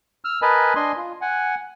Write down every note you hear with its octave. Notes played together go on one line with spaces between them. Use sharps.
E6 F6
A#4 B4 D#5 G#5 A5 B5
D4 D#5 G#5 C6
F4
F#5 G#5